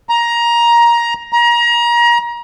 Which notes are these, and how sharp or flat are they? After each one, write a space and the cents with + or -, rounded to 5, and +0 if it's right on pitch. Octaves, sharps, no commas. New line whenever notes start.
A#5 +15
A#5 +30